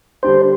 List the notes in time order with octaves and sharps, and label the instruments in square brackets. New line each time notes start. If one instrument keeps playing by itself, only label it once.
[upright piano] D3 G3 D4 G4 [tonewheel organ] C5